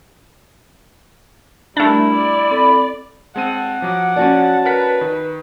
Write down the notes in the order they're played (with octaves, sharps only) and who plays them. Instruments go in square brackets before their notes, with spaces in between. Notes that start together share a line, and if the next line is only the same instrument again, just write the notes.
[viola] G3 A#4 [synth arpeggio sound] A3 D4 [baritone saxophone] E4
[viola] D5
[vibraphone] C4 A4 B5
[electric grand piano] G#3 C4 D#7 [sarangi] F#5 [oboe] A5
[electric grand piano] F3 F#3 [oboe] D6
[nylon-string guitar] C#4 F#4 D5 [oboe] A5
[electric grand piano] A#4 F#5 B6 [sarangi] B4
[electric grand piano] D#3